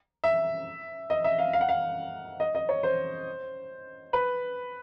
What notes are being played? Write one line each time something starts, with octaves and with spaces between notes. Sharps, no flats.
E5
D#5
E5
F5
F5
F#5
F5
D#5
D#5
C#5
C5
B4